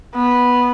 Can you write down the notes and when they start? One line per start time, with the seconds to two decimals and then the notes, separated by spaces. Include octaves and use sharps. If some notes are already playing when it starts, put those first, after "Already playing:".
0.16 B3